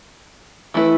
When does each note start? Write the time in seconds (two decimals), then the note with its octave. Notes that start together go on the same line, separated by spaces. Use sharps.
0.74 E3 A3 E4 B4